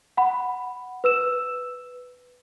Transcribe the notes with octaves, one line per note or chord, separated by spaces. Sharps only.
F#5 B5
B4 E6 E7